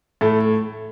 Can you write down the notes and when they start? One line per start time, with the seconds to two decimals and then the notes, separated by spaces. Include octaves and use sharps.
0.21 A2 A3